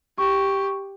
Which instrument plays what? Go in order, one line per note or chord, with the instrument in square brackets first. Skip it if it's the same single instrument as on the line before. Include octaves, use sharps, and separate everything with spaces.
[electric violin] G4 [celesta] C#6